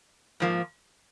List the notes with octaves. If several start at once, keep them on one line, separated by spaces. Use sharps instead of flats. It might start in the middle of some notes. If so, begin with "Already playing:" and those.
G#2 F3 A#3